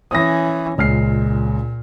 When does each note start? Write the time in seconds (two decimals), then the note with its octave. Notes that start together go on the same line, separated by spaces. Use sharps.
0.11 E3 C#4 D#6 A#6
0.78 C#2 A#2 F6 C7